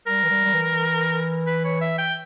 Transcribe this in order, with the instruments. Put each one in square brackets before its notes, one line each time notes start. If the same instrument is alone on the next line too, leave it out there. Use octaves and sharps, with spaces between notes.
[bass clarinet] G3 [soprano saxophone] A#4
[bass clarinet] E3
G3
G3
E3
[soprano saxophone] B4
C#5
E5
G5